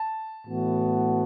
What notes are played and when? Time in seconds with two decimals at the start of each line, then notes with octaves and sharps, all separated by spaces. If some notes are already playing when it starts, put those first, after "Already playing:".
Already playing: A5
0.48 A2 E3 B3 F#4